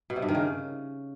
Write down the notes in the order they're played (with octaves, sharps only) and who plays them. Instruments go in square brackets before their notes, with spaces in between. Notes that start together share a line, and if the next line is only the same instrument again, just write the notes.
[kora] B2
C3
G2
D#3
C#3